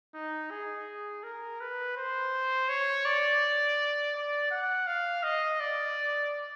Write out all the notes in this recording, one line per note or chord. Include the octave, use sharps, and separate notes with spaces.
D#4
G#4
A#4
B4
C5
C#5
D5
D5
F#5
F5
D#5
D5